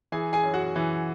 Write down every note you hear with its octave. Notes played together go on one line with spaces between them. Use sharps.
E3 G#4 G#5
G#4 G#5
F#2
F#4 F#5
E3